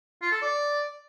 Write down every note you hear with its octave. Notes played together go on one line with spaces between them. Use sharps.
F4
A4
D5